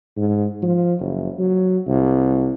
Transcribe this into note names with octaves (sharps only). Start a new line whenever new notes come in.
G#2
F3
F#1
F#3
C2